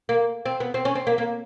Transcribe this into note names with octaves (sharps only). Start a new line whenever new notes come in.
A#3
C4
B3
C4
C#4
C4
A#3
A#3